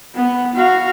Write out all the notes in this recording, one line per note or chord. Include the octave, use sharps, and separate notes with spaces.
B3
F#4 F5